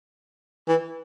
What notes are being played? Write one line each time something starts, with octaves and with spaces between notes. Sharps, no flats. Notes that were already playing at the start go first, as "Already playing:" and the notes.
E3